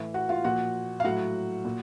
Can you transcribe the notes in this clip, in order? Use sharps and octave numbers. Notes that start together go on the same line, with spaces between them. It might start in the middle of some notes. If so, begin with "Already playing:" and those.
Already playing: A2 E3
F#4 F#5
F4 F5
A#2 F3 F#4 F#5
F5
A2 F#3 F#4 F#5
A#2